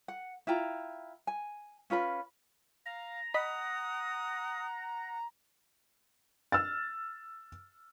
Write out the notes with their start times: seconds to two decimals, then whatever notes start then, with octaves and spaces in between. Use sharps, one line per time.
0.08 F#5
0.47 E4 F4 G5 A#5
1.27 G#5
1.90 C#4 F4 B4 B5
2.86 F5 A#5
3.34 D#5 F#5 B5 D#6 B6
6.52 E6 F6 A6